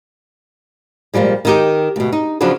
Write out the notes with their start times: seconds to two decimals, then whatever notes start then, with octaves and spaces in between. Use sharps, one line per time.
1.14 A#2 C#3 F3 G3 G#3
1.45 D#3 D#4 G4
1.96 D2 B2
2.13 D#4
2.41 C#3 F3 F#3 D4 F#4 B4